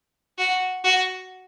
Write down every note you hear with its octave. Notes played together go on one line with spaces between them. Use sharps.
F#4
F#4